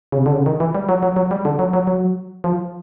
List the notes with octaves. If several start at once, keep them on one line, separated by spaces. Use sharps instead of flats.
C#3
C3
D3
C#3
D#3
E3
G3
F#3
F#3
F#3
G3
D3
F#3
F#3
F#3
F3